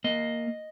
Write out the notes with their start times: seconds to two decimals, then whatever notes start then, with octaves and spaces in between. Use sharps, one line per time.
0.04 A#3 D#5